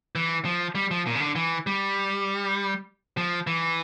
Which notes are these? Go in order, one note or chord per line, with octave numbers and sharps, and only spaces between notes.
E3
F3
G3
F3
A#2
C#3
D3
E3
G3
F3
E3